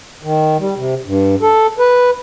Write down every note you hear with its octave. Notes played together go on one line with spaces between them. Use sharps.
D#3
G3
C3
G2
A4
B4